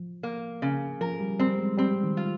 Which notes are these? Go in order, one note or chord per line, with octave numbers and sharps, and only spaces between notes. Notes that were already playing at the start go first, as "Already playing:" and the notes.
Already playing: F3
A#3
C#3
F3 A#4
G3
G3 C4
G#3
G3 C4
D#3
F4